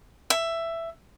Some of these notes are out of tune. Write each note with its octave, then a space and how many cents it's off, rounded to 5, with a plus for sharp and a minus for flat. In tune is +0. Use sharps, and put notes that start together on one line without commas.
E5 +10